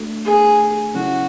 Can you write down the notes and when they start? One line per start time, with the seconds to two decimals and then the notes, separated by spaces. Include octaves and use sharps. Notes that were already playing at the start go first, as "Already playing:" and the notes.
Already playing: A3 D4 F#4 A4
0.25 G#4
0.94 C#3 F#3 C#4 E4 F#4